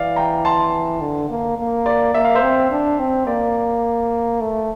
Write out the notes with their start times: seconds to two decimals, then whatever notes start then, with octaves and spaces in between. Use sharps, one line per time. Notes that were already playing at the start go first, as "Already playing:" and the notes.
Already playing: E3 D5 F5
0.16 G5 A#5
0.45 A5 C6
1.01 D3
1.30 A#3
1.58 A#3
1.86 D5
2.14 A#3 E5
2.25 F5
2.35 C5 E5
2.42 C4
2.71 D4
2.99 C4
3.27 A#3 D5
4.41 A3